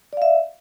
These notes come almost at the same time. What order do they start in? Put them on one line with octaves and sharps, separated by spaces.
D5 F5 E5